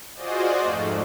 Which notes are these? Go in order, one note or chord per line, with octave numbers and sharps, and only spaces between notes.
F4 F#4 G#4 C5 D5 D#5
F2 G#2 A3